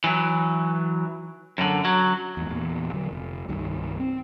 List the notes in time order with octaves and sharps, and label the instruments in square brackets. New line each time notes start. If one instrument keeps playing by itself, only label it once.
[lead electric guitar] E3 F#3
F#2 D3
F#3
[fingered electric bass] E2 G#2
E2 A#2
D3 F#3
F1
C2 G2 D#3
C4